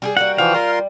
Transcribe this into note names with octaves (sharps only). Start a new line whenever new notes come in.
G3 G4 G#4
G3 A#3 F#4 F#5
E3 F3 F#4 F5 G5
G3 F4 A#4 C6